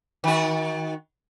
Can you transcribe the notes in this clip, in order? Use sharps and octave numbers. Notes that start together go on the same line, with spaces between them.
D#3 F#4